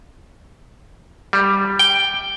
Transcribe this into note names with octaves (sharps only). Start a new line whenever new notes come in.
G3
G5